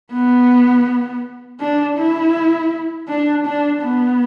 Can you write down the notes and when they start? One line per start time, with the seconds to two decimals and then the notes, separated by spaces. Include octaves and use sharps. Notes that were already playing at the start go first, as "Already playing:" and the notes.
0.12 B3
1.60 D4
1.97 E4
3.08 D4
3.46 D4
3.82 B3